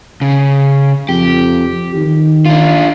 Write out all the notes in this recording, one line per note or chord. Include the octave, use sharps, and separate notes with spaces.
C#3
F2 G4
D#3
D4 F4